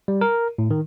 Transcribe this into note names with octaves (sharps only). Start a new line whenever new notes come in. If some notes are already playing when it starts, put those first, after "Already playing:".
G3
A#4
A2
D#3